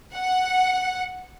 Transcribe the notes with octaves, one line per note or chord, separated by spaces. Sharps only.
F#5